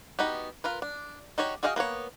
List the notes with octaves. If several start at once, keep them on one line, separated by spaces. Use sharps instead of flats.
B3 D#4 F#4 G4
F4 A#4 B4
D4
D#4 F#4 G4 C#5
F#4 G#4 D#5 F5 G5
A#3 B3 A#4 C#5